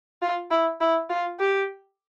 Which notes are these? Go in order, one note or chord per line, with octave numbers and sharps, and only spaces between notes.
F4
E4
E4
F4
G4